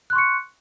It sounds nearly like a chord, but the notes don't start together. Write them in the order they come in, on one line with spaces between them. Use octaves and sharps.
F#6 C6 C#6 C#7